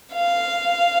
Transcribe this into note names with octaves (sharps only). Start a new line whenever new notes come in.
F5